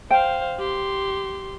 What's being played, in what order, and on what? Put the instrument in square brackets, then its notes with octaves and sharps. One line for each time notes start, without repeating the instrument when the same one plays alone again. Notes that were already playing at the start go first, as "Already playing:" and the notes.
[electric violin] C5 F5 [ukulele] G5
[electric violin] G4 C6